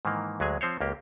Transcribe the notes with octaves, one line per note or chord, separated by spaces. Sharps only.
G#2 D#3 E3 A#3
D2 F#3 G#3 G#4 G#5
F3 C4 C5 C#5
C#2 A#3 G4